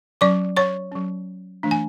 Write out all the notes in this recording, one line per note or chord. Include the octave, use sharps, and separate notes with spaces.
F#3 C#4 D5 D6
C#5 C#6
F#3 C#4
E3 A3 D4
G#5